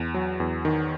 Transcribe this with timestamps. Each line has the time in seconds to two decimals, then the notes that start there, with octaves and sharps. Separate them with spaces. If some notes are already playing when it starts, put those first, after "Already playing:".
Already playing: E2
0.14 F#3
0.40 E2
0.65 D#3